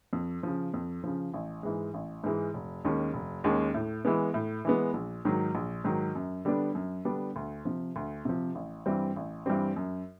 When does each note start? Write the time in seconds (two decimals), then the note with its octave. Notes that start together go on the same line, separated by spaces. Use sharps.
0.13 F2
0.43 C#3 F3
0.74 F2
1.04 C#3 F3
1.34 A1
1.63 G#2 E3 G#3
1.94 A1
2.24 G#2 E3 G#3
2.54 F1
2.85 D#2 D#3 G#3 C#4
3.14 F1
3.44 D#2 D#3 G#3 C#4
3.74 A2
4.05 E3 G#3 B3
4.34 A2
4.65 E3 G#3 B3
4.94 A#1
5.25 G#2 D#3 F#3
5.55 A#1
5.84 G#2 D#3 F#3
6.15 F#2
6.45 D3 G3 B3 D4
6.75 F#2
7.05 D3 G3 B3 D4
7.36 D2
7.65 C3 F3
7.96 D2
8.25 C3 F3
8.55 A1
8.86 G2 E3 G3 C4
9.16 A1
9.46 G2 E3 G3 C4
9.76 F#2